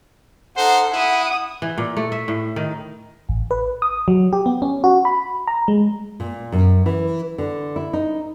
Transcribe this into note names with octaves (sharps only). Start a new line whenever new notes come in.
D#4 A4 C5 F#5
E4 F#5 D#6
E3
A#2
A3
E5
A2
D#3
A1
B4
D#6
F#3
G4
B3
C#4
F#4
B5
A#5
G#3
A#2
F#2
E3
D3
E4
D#4